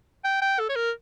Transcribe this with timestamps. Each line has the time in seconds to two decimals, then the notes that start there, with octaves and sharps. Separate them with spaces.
0.24 G5
0.42 G5
0.59 A4
0.69 C#5
0.76 A#4